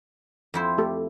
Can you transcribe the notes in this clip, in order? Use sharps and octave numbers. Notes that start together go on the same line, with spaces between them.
F2 E4 C5
A3 G4 A4